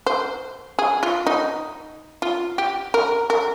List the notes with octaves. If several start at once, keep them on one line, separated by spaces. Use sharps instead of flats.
C5
G#4
F4
D#4
F4
G4
A#4
A#4